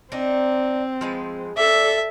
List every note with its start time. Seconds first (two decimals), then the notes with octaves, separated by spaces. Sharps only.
0.12 C4 D4 D#4
1.01 F3 G#3 B4
1.57 A4 D5 E5